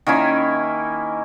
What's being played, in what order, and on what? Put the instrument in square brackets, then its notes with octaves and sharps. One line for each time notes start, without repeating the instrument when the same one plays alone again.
[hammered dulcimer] D#3 A#3 C#4 E4